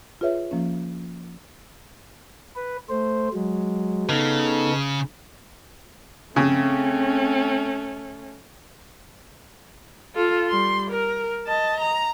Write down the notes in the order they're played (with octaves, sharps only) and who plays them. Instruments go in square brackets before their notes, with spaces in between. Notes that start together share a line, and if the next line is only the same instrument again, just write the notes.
[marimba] F4 G#4 B4 C#5 E5
F3 A#3 C#4
[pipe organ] B4
A3 C5
F#3 G#3
[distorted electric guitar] C#3 [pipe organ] B3 D#4 A4
[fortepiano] C#3 [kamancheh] A3 C#4 [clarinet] C4
[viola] F4 A4
G3 C6
A#4
D#5 A5
A#5